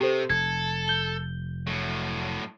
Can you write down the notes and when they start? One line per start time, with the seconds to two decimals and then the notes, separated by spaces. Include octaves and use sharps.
0.01 C3 G4 A4 C5
0.30 F1 A4 G#6
0.88 G6 G7
1.67 A2 F#3